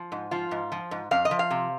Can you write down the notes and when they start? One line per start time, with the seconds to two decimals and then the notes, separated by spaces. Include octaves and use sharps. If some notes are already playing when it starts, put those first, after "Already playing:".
Already playing: F3
0.12 G#2
0.31 F3 F4
0.51 G#2
0.72 F3
0.91 G#2
1.11 F2 F5
1.25 D#5
1.31 F3
1.39 F5
1.51 C3